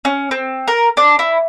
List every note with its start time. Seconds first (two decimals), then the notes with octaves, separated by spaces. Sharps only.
0.05 C#4
0.31 C4
0.68 A#4
0.97 D4
1.19 E4